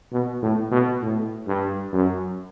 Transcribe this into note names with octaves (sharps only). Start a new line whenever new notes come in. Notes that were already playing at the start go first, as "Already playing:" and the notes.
B2
A2
B2
A2
G2
F#2